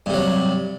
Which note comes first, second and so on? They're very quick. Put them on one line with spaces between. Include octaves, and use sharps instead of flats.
G2 C3 F#3